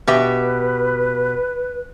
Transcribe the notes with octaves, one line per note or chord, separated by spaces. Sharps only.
B2 G4 B4 E5